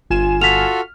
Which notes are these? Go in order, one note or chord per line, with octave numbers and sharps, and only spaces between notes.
G1 F4 G#5 E7
F4 F#4 A4 F6 B6 F7